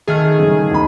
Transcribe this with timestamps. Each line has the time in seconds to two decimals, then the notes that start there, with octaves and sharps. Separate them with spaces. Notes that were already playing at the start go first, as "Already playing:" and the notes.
0.08 D#3 A3 G#4 A4 F6
0.38 G1 C#3
0.71 D#2 B5